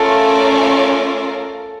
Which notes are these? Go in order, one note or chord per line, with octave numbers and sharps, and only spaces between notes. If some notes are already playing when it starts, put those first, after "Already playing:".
Already playing: A3 C#4 F4 A4 A#4 D5